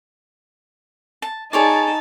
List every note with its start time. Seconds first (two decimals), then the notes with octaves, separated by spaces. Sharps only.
1.22 A5
1.53 D#4 G#4 C#5 D5 A5